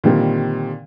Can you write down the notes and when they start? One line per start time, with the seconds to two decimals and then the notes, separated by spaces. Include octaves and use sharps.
0.04 A#2 D3 D#3 G3 C4